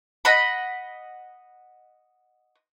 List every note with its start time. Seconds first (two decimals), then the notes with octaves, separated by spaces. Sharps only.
0.25 D#5 F#5 B5